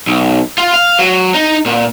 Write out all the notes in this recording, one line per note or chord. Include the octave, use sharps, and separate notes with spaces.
B1
F4
F5
F#3
D#4
A#2